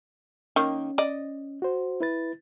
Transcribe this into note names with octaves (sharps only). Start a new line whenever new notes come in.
D#3 A#3 C#4
D5 D#5
F#4 C5
E4 B4 A6